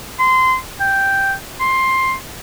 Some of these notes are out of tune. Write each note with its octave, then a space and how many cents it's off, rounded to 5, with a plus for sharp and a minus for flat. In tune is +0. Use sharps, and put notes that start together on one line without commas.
C6 -20
G5 +0
C6 +10